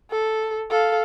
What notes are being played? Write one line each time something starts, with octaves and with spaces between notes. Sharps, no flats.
A4
A4 F5